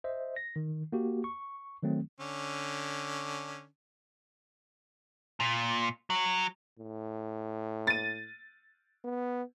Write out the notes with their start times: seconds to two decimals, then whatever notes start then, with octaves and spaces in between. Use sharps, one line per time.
0.04 C5 D#5 E5
0.36 A#6
0.56 D#3
0.92 A#3 F#4 G4
1.24 C#6
1.83 D#3 F#3 A3 C4
2.20 D3 C#4
5.40 A#2
6.10 F#3
6.79 A2
7.87 A6 D#7
9.04 B3